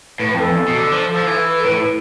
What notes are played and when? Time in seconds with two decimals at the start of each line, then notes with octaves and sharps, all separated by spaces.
0.19 A2 B4
0.30 B4
0.34 F2
0.40 A4
0.49 E2
0.68 B2
0.78 D3
0.92 F3
1.07 A4
1.17 F3
1.27 E3
1.36 B4
1.60 A4
1.65 A2 B4
1.79 E4